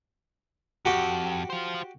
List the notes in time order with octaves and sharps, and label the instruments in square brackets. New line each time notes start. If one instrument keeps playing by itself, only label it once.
[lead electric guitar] F2 [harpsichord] F#4 G4 G5
[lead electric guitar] F4 C5